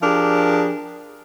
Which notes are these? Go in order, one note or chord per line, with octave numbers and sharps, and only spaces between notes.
F3 D4 G4 G#4 A#4